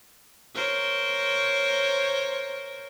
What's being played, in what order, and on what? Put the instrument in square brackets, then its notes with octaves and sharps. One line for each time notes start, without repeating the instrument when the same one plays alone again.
[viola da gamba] A#4 C5 C#5